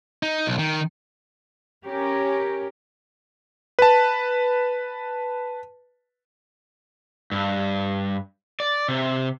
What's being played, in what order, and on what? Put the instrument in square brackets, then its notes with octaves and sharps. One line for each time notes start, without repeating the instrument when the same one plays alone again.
[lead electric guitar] D#4
B1
D#3
[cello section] C#4 G4 A#4
[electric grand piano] B4 A5
[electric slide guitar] G2
D5
C3